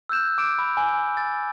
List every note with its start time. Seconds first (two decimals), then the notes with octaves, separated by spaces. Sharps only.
0.09 E6 F#6 G6 E7
0.38 D6 D7 E7
0.59 B5 E6
0.77 G#5
1.17 A6